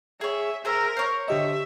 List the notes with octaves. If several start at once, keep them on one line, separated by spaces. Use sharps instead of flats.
G#4 C#5 E5
G#4 A#4 C5 E5
C5 C#5
D3 G4 D#5 E5